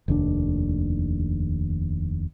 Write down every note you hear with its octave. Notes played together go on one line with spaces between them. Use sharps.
F1 D#2 D#3 D4